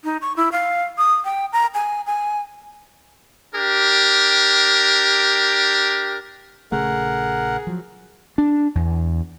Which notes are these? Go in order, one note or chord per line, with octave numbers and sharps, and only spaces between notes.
D#4
C#6
E4
F5
D#6
G5
A#5
G#5
G#5
D4 G4 A#4
A#1 C#3 A3 G#4 A#4 F#5
F3 F#3
D4
E2